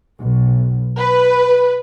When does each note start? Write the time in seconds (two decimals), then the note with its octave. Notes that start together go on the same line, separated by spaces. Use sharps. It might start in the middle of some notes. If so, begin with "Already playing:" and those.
0.20 B1
0.98 B4